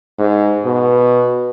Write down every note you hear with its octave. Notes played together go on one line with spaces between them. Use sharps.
G#2
B2